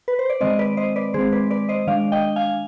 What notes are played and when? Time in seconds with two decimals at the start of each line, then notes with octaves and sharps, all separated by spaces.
0.08 B4
0.19 C5
0.30 D5
0.41 D#3 G#3 C4 C5 D#5
0.59 B4 D5
0.77 C5 D#5
0.96 B4 D5
1.14 D#3 G#3 C4 G#4 C5
1.32 B4 D5
1.50 B4 D5
1.69 C5 D#5
1.87 D#3 G#3 D4 D5 F5
2.12 D#5 G5
2.36 F5 G#5